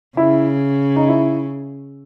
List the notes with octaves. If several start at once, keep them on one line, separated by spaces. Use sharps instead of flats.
C#3 E4
D#4
E4